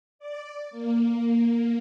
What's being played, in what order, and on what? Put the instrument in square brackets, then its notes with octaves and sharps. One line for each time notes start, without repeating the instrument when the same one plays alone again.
[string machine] D5
A#3